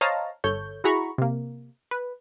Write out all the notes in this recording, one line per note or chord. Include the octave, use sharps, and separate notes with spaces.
C5 C#5 D#5 F5 A5 A#5
G1 A4 C#5 G6
E4 F#4 G#4 A#5 B5 C#6
C3 A#3
B4